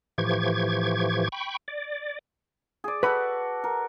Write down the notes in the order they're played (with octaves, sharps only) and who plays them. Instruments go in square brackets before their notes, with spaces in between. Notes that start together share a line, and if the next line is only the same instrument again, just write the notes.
[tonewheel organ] A2 E3 F3 G4 C#6 G#6
G5 B5 C#6
D5
[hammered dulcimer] G#4 D5
[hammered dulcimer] F#4 A4 [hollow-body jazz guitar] B4 B5
[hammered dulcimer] A#4